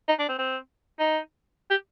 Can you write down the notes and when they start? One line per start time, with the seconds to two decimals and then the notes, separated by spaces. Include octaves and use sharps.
0.08 D#4
0.19 D4
0.29 C4
0.39 C4
1.00 D#4
1.70 G4